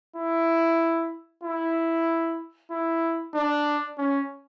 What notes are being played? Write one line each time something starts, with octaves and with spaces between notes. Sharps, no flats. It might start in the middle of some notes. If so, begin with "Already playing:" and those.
E4
E4
E4
D4
C#4